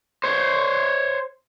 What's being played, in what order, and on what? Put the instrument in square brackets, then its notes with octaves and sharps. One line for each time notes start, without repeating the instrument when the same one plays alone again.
[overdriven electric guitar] C5 C#5